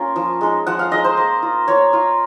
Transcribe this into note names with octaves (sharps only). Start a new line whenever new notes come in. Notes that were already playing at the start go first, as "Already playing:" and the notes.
Already playing: A#3 C#4 F4 A#4
F3
G#3 D#4
F3 F#5
F5
G#3 D#4 D#5
C5
A#3
F4
A#3 C#5
F4